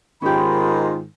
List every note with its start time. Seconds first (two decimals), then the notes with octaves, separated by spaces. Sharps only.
0.22 G#2 D#3 C#4 F4 G4 B5